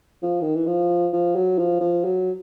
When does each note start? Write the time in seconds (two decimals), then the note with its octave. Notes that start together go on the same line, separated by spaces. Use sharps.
0.22 F3
0.41 D#3
0.55 E3
0.67 F3
1.13 F3
1.35 F#3
1.58 F3
1.80 F3
2.04 F#3